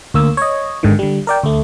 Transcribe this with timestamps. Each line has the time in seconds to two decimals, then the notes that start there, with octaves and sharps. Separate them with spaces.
0.14 D2 A#3 E6
0.37 C#5 D#5
0.83 G#1 G#2 D3 D#3
0.99 D3 G3
1.27 A#4 D5 G5
1.44 D2 A3